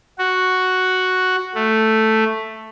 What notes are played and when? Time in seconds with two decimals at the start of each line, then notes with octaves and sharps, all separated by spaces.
0.18 F#4
1.55 A3